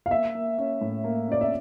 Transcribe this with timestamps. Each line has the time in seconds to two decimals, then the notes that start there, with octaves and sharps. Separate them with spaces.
0.06 F5
0.11 A#3 E5
0.35 A#3
0.58 C#4
0.81 A2
1.04 A#3
1.28 C#4 D5
1.41 E5